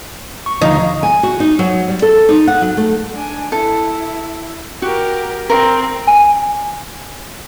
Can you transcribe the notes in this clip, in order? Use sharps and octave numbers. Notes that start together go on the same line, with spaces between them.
C#6
D#2 D3 F3 D4 D#4 F5 A#5
G#5
F#4
D#4
F#3
G3
A4
D#4
F#5
F#3
A3
D4 G#5
E4 A4
F#4 G4 A#4
C4 A#4 C6
G#5